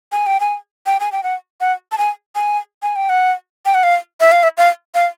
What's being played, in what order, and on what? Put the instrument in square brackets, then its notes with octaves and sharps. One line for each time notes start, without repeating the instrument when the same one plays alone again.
[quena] G#5
G5
G#5
G5
G#5
G5
F#5
F#5
A5
G#5
G#5
G#5
G5
F#5
G5
F#5
F5
E5
F5
E5
F5
F5